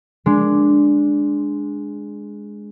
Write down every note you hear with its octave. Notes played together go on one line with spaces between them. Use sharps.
G#3 D4